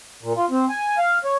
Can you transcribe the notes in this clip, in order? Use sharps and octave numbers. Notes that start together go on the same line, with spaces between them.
A#2
F4
C4
G#5
F5
C#5